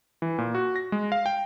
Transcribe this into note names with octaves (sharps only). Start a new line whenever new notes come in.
E3
A#2
F#4
A#6
G#3
F5
G5